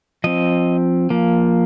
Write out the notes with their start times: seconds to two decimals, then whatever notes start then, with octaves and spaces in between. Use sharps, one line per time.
0.24 F3 C4 D#5
1.10 F3 A#3